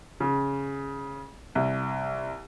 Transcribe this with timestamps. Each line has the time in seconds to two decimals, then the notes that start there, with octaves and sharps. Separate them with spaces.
0.20 C#3
1.55 C2